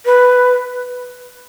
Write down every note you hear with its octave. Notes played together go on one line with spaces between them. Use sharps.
B4